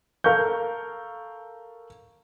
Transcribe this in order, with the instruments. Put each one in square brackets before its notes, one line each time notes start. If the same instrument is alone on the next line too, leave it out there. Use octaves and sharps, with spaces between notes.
[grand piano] A4 A#4 F5 C#6 G6